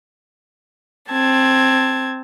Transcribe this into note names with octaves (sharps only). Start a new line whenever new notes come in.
C4 A5 G#6